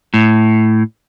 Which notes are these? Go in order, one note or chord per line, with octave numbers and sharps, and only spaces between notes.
A2